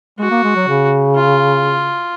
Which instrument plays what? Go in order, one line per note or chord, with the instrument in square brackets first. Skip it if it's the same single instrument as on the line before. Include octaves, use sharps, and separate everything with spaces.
[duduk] G#3 [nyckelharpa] F#4
[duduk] A#3
G#3
F#3
C#3
[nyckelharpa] F4